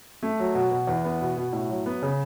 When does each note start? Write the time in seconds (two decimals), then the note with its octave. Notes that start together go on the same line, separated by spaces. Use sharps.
0.23 A3
0.39 F#3
0.55 B2
0.71 B2
0.87 E2
1.04 B3
1.21 B2
1.37 B2
1.53 A2
1.70 F#3
1.86 B3
2.02 C#3